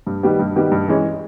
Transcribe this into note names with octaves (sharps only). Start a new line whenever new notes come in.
G2
D#3 G3 B3 G4
G2
D#3 G3 B3 G4
G2
E3 G#3 C#4